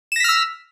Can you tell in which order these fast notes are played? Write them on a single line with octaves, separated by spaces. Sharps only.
E7 A#6 B6 F6 E6